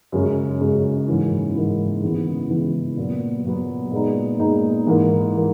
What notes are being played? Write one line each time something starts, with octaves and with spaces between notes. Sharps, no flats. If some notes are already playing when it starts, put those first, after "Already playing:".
F#2 C#3 G#3 C#4
F#2 C#3 G#3 C#4
G#2 E3 A#3 C#4 E4
G#2 E3 A#3 C#4 E4
C#3 E3 G#3 B3 E4
C#3 E3 G#3 B3 E4
A#2 F#3 B3
A#2 F#3 B3
A#2 G#3 B3 D#4
A#2 G#3 B3 D#4
G#2 E3 A#3
E3 A#3